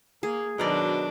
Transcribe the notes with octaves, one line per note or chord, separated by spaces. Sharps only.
A#3 G#4
B2 D#3 F#3 D4 A#4 D5